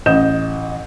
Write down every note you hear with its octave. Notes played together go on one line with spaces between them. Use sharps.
A1 D#5 G6 E7